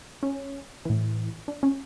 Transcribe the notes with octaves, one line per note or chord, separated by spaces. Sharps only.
C#4
A2 E3
D4
C#4